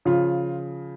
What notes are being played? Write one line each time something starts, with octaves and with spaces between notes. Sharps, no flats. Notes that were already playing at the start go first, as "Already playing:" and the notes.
C#3 F3 F4